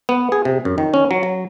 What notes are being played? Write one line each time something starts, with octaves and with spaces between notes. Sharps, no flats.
B3
G#4
C3
F#2
D#3
C#4
F#3
F#3